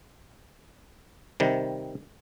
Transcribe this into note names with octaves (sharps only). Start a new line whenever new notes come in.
C3 D#3 G3